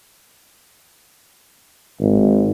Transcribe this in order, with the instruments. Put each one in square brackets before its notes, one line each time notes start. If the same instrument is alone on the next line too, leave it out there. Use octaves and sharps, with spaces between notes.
[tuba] G#1